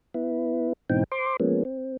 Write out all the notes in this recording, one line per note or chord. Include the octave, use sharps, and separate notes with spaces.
B3 E4
G#2 B2 E3 C4 D#4 G5
C5 C6 D6
F3 G#3 A#3 B3 C#4
C4